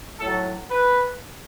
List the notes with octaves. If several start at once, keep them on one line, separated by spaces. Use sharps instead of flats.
A2 F#3 A4
B4